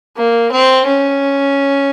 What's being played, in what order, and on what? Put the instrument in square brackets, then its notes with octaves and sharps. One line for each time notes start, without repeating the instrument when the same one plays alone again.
[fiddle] A#3
C4
C#4